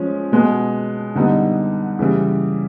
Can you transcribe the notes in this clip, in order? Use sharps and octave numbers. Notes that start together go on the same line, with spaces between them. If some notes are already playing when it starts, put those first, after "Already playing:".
Already playing: F3 G#3 C#4
B2 G#3 B3
D3 G3 B3 D#4
C#3 E3 G3